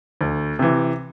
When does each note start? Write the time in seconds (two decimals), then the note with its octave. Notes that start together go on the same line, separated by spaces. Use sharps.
0.21 D2
0.59 C3 E3